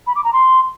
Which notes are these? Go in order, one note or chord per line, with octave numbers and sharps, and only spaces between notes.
B5
D6
A#5
C6